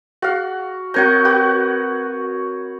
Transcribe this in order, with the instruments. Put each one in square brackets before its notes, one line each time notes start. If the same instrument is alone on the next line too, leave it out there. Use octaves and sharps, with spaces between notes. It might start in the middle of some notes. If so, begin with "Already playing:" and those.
[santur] F#4 F5 [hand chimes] G#4
[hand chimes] C4 A#4 G6 [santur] F#4 C#5 A#5
[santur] F#4 B4